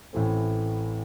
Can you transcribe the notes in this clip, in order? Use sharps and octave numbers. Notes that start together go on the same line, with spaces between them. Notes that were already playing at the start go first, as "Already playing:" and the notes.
A1 A2 E3 A3 C4